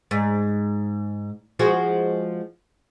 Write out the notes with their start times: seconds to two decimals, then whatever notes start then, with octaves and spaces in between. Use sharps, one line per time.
0.11 G#2
1.59 F3 G#3 F#4